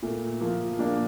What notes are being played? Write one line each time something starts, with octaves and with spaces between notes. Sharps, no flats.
A#2 A3
F3 A#3
A#2 A#3 D4